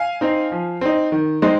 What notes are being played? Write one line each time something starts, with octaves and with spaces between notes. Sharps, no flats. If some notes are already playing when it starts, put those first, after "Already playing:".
Already playing: F5 G#5
C4 D#4
F3
C4 D#4
D#3
G#3 C4 D#4